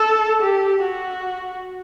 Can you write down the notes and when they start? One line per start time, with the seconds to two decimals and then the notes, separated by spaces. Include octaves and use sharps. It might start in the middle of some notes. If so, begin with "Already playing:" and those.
Already playing: A4
0.41 G4
0.82 F#4